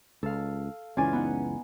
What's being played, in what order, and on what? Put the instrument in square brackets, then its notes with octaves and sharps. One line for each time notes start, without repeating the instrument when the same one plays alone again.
[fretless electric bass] C#2 [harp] A4 F5
[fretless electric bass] F#1 C#2 E3 [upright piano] C#4 [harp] F4 D5 G#5
[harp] B3 D#4 F#5